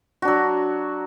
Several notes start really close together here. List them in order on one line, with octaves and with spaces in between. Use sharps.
F#4 D4 F#3